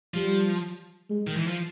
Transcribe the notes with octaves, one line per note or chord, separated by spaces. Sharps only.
F3 G3
G#3
D#3
E3
F3